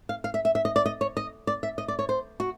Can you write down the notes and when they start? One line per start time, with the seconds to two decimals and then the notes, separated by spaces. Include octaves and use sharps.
0.09 F5
0.24 F5
0.34 E5
0.45 E5
0.55 E5
0.65 D#5
0.76 D5
0.86 D#5
1.01 C#5
1.17 D#5
1.47 D5
1.63 E5
1.78 D#5
1.88 D5
1.99 C#5
2.09 C5
2.40 F#4